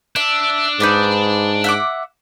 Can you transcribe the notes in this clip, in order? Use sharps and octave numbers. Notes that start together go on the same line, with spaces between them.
D4 E5
G#2 D#4 B4 D5
E5 F#5 D6